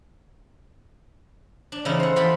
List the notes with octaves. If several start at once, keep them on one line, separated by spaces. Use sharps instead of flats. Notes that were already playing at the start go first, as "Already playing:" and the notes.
D4
C#3 E3 F3 D#4 E4 A4
C5 F#5
E3 F4 G4 A4 B5